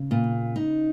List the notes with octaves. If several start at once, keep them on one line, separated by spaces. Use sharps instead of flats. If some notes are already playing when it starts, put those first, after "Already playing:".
Already playing: C#3
A#2
D#4